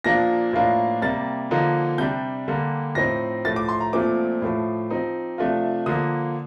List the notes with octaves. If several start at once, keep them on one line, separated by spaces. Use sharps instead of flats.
A#2 F3 A#3 D4 F4 A#6
A2 F3 A#3 D4 F4
C3 G3 A#3 A6
D3 F3 A#3 D#4
C3 G3 D4 G6
D3 G3 A#3
A2 F3 C4 D#4 A#6
A2 F3 A3 A6
D6
C6
A#5
A#2 F3 A3 C4 D6
A2 F3 A3
F3 C4 D#4
C3 F3 A3 D4 F4
D3 F3 A#3 D#6